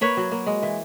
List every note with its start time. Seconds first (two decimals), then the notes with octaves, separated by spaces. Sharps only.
0.01 A#3 B4 C#5
0.17 F#3
0.31 A#3
0.46 G#3
0.63 E3